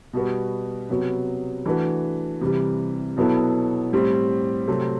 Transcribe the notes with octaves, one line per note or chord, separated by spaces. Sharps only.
B2 G3 B3 F#4
C3 F#3 B3 F#4
E3 A3 D4 F#4 B4
C3 E3 G3
B2 F#3 B3 E4 A4
A2 G3 C4 G4
C3 F#3 A3 C4